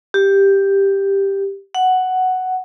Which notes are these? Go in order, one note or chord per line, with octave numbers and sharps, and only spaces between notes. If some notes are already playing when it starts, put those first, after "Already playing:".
G4
F#5